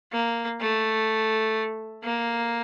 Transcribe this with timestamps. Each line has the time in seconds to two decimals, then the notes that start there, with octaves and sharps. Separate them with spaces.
0.12 A#3
0.60 A3
2.04 A#3